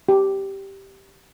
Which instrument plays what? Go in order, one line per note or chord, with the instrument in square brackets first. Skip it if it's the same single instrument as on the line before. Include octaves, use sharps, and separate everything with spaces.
[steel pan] G4